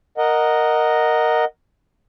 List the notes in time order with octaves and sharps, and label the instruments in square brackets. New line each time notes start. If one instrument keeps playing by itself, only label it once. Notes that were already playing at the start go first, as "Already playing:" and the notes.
[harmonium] A#4 D#5 F#5